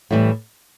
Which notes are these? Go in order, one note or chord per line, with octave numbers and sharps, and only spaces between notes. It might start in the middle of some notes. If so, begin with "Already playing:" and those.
A2 E3 G3